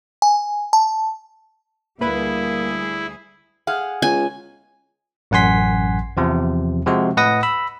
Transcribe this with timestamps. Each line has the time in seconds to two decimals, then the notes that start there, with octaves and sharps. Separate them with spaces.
0.22 G#5
0.73 A5
2.01 D2 A#2 G3 A#3 E4 G#4 B4 B5
3.67 G#4 F5 F#5
4.02 C#2 G#5
5.31 A1 F#2 F#5 G#5 C6 B6
6.17 E2 C3 F3
6.86 C3 F3 G#3 F#4
7.17 A2 B4 D#5 F#5 D#6 A#6
7.43 B5 E6